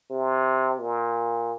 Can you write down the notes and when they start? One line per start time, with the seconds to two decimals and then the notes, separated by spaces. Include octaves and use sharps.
0.11 C3
0.80 A#2